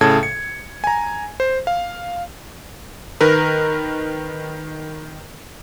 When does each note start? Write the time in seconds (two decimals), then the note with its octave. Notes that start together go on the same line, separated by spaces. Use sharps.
0.01 A2 C#3 A4 A5 G#6
0.23 C#7
0.84 G#5 A#5
1.40 C5
1.67 F5
3.21 D#3 A#4 B4